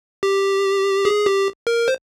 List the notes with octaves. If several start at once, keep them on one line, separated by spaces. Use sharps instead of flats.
G4
G#4
G4
A#4
C5